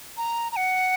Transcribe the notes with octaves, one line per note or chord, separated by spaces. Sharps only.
A#5
A#5
F#5